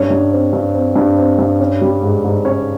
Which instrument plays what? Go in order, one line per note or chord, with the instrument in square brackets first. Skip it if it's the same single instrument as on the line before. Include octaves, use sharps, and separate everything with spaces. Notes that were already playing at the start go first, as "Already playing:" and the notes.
Already playing: [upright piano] G2 C#4 C#5
G2
C4
G2
C4
G2
C4
G2
C#4
G3
G#2
G#2
C#4 C#5